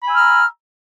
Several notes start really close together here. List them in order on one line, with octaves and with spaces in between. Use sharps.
B5 G#5 E6 F6 A#5